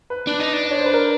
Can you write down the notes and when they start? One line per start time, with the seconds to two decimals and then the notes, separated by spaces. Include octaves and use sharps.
0.10 B4
0.27 D4
0.40 D#4
0.53 D4
0.64 D5
0.71 C#5
0.78 C5
0.86 B4
0.93 A#4